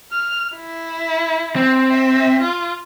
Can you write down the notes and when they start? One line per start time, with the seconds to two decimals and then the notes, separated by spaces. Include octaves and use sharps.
0.12 F6
0.55 E4
1.56 C4
1.91 E5
2.41 F4